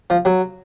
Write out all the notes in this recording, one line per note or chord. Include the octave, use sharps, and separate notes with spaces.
F3
F#3